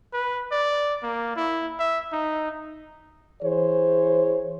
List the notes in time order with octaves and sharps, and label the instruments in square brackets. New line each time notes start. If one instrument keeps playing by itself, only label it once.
[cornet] B4
D5
A#3
E4
E5
D#4
[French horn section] E3 G#4 C5 C#5